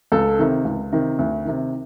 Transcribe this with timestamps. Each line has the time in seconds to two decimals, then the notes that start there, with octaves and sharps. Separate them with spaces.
0.12 C#2 A4
0.39 C3 D#3
0.65 C#2
0.92 C3 D#3
1.19 D2
1.45 C3 D#3